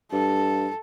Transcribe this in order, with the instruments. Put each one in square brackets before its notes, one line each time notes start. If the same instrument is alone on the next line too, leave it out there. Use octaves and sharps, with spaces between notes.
[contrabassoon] G2 [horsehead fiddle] A4